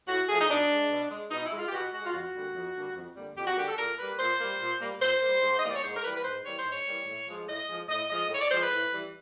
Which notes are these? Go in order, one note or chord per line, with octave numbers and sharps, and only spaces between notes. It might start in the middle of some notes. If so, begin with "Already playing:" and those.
A2 F#4
F3 A3 G#4
D#4
B2 D4
G#3
B2
G#3
B2 D#4
E4
G#3
F4
G4
B2 F#4
G#3 F#4
F4
F2 F#4
D3 G3 A#3
F2
D3 G3 A#3
F2
D3 G3 A#3
F2 G4
F#4
D3 G3 A#3 G4
A4
A#2 A#4
G3 A#3 B4
A#2 C5
G3 A#3
A#2
G3 A#3
A#2 C5
G3 A#3
G#2
D#5
E3 G3 A#3 D5
C#5
G#2 C5
A#4
E3 G3 A#3 B4
B4
G#2 C5
E3 G3 A#3 C#5
C5
G#2
C#5
E3 G3 A#3
A2
F3 G#3
A2 D#5
F3 G#3
A2 D#5
F3 G#3 D#5
A2
C#5
D5
F3 G#3 C5
B4
A2
E3 G3